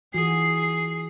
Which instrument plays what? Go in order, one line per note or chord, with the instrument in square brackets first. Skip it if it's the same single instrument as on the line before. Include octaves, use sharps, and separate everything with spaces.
[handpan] E3 F4 F#4 [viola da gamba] G#4 [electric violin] C7